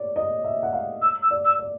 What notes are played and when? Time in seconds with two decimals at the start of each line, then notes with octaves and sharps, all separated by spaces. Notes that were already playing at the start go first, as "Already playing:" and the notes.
Already playing: C#5 D5
0.16 D#5
0.44 E5
0.63 F#5
0.73 F5
1.02 E6
1.22 E6
1.31 D5
1.45 E6
1.59 D5